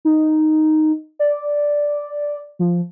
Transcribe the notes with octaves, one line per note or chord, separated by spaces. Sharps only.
D#4
D5
F3